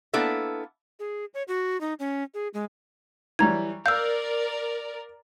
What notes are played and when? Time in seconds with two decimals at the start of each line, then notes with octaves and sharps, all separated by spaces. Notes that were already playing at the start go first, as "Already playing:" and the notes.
0.14 A#3 B3 D4 E4 A4 E5
1.00 G#4
1.34 C#5
1.48 F#4
1.81 D#4
2.00 C#4
2.34 G#4
2.54 G#3
3.39 E3 F#3 G3 A#5 G#6
3.86 A#4 D5 F5 E6 G6